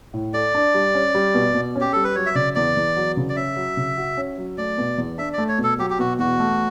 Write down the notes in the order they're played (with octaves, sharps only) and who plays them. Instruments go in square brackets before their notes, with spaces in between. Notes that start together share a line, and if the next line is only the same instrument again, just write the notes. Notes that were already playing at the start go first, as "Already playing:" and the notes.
[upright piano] A2
[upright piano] A4 [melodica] D5
[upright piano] D4
G3
C#4
G3
B2
B2
C#4
[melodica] G4
[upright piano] G3 [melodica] A4
[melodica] B4
[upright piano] F#3 [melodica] C#5
[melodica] E5
[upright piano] C#3 [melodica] D5
[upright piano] E2 [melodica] D5
[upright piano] E2
F#3
C#3
[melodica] D5
[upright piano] C#4 [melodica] E5
[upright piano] F#3
C#3
F#4
C#4
F#3
[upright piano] A3 [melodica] D5
[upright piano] B2
E2
[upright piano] D4 [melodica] E5
[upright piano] A3 [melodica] D5
[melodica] C#5
[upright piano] B2
[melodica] A4
[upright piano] F#3 [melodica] G4
[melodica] G4
[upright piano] B2 [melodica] F#4
[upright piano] E2 [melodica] F#4
[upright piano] A3